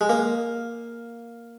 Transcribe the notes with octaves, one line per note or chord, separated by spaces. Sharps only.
G#3
A#3